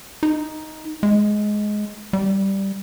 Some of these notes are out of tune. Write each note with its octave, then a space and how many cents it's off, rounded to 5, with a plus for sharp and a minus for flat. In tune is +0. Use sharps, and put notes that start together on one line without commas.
D#4 +5
G#3 +10
G3 -5